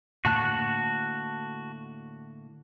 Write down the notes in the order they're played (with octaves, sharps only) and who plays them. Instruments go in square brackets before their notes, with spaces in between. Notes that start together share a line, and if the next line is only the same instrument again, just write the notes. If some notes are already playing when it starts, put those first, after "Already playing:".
[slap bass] A2 D3 A#3 [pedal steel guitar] F#4 A5 F#6